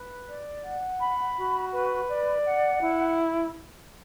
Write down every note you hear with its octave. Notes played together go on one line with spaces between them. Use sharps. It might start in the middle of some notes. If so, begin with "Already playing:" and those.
Already playing: B4
D5
F#5
B5
F#4
B4
D5
F#5
E4